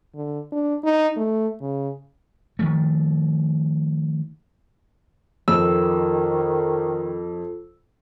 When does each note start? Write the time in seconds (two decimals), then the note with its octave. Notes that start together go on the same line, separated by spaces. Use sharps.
0.15 D3
0.52 D4
0.84 D#4
1.17 A3
1.61 C#3
2.59 D#3 F3 A3
5.48 F2 D#3 F4 A4 E6